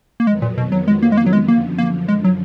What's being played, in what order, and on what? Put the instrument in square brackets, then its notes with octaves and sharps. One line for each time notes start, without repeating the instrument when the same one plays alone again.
[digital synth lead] A#3
[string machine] F2 D#3 F#3 B3 [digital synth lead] G#3
[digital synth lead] A#2
B2
F#3
G#3
A#3
G#3
A#3
F#3
G#3
[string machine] F#2 D3 F3 [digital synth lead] A#3
[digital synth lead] A#3
G#3
F#3